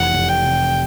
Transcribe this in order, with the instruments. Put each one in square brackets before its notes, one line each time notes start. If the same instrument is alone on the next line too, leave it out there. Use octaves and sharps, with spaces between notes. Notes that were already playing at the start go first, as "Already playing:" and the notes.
Already playing: [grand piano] F1 E3 [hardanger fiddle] F#5
[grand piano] F1
[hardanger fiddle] G5
[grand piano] C3